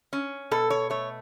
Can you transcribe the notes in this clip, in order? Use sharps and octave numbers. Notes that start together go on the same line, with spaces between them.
C#4
B2 A4
C#5
A3 C#5